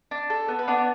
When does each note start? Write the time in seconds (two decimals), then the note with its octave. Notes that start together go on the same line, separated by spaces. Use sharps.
0.11 D4
0.30 A4
0.48 B3
0.59 B4
0.68 B3 D4 D5